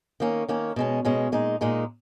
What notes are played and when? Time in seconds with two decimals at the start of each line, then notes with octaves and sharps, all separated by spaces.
0.20 D#3 A#3 C#4
0.49 D#3 A#3 C#4
0.76 B2 G#3 C#4
1.05 B2 G#3 C#4
1.32 A#2 G#3 D#4
1.61 A#2 G#3 D#4